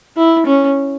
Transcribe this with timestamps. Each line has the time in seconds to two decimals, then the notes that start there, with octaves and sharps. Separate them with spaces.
0.17 E4
0.46 C#4